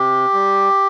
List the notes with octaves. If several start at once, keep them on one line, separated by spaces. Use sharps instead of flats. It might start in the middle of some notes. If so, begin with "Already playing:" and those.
Already playing: C3 G4
G3